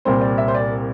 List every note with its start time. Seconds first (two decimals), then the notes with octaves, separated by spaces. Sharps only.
0.05 C2 A#2 G3 C4 C5
0.21 D5
0.38 E5
0.48 C5
0.55 D5